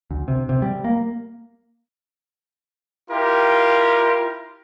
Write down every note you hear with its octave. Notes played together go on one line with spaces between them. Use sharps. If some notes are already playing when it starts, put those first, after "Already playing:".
D2
C3
C3
G3
A#3
E4 F4 G4 A#4